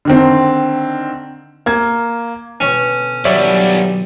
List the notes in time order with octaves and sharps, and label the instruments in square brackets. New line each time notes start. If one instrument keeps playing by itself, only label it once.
[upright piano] D3 D#3 C4
A#3 G#6
[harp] B2 D3 [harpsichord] C#4
[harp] D#3 E3 F#3 [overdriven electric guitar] G3 B3 [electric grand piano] C#5 D5 E5